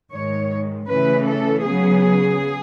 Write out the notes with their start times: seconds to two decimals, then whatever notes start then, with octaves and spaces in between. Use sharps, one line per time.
0.12 G#2 D#3 G#3 C#5
0.88 C#3 E3 A3 C#4 B4
1.26 A4
1.64 C#3 F#3 B3 G#4